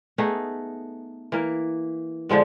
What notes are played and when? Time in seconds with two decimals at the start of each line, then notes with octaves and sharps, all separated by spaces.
0.18 A3 B3 D#4 G#4
1.32 E3 A#3
2.29 D3 F3 G#3 B3